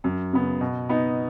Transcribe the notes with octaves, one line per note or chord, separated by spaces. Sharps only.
F#2
C#3 B3
B2
B3 D#4